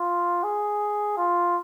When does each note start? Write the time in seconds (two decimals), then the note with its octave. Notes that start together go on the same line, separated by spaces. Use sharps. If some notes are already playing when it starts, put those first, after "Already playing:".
Already playing: F4
0.44 G#4
1.18 F4